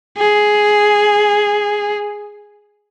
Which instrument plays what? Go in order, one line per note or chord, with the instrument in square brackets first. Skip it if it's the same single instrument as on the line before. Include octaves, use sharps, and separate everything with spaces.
[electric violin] G#4